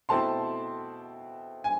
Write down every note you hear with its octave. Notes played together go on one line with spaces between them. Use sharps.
B2 A3 C4 E4 A5 C6
G#5